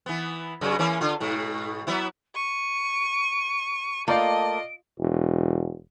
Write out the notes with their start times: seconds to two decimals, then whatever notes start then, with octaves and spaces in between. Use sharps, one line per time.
0.06 E3 B3
0.61 F#2 C#3 F#3
0.79 E3 A#3 C#4
1.01 D3 F4
1.20 G#2 B2
1.87 F#3 B3 E4
2.35 C#6 D#7
4.08 A3 A#3 F4 D5 D#5 F5 D7
4.99 E1